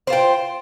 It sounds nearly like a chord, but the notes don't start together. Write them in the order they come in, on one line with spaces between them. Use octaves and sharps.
C5 F4 G5